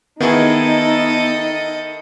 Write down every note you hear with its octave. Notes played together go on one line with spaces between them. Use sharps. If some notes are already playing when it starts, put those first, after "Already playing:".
D#3 B3 D#4 E4 G#4 A4 D#5